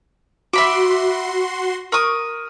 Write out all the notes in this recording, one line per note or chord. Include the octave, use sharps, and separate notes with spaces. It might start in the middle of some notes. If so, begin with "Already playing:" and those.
F#4 E5 B5 C6 D6
A#4 C#6 D#6